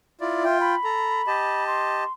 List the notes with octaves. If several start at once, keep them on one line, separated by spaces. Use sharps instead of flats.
E4 F4 D5
F4 E5 G5
B5
A4 A#5
G4 D#5 A5
C6